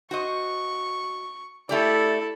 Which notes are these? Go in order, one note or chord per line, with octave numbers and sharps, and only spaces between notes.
F#4 C5 D#5 C#6
A3 E4 G4 A4 D5